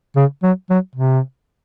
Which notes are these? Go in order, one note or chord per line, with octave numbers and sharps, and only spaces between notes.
C#3
F#3
F#3
C3